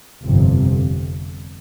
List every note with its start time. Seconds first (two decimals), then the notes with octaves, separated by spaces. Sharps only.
0.24 G1 F2 C3